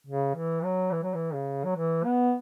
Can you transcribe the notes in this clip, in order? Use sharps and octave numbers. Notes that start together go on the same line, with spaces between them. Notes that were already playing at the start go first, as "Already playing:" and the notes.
C#3
E3
F#3
E3
F#3
E3
C#3
F#3
E3
B3